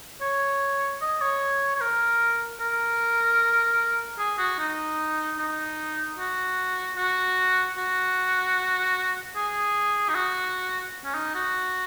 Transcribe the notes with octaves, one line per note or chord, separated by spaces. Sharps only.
C#5
D#5
C#5
C#5
A#4
A#4
G#4
F#4
D#4
D#4
F#4
F#4
F#4
G#4
D#4
F#4
C#4
D#4
F#4